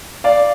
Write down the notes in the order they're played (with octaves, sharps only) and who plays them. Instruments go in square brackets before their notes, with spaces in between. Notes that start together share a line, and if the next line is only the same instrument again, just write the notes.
[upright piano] D5 F5